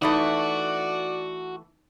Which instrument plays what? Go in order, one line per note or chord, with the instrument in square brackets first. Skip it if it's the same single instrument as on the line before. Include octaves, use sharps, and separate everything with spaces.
[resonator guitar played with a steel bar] E3 A3 [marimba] D#4 B5 D#6 [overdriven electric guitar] F#4 [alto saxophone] D5